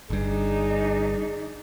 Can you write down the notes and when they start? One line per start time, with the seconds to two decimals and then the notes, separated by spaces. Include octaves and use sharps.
0.10 G1 G2 D4 D#4 G#4